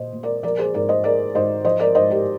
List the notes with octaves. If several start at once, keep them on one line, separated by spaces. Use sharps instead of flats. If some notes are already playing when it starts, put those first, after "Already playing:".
Already playing: A#2 C5 D#5
A#2
A#4 D5
F3 A#4 D5
G#4 C5
G#2 A#4 D5
C5 D#5
G#3 A#4 D5
G#2 C5 D#5
F3 C5 D#5
A#4 D5
G#2 C5 D#5
G4 A#4